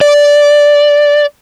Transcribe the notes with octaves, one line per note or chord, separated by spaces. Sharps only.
D5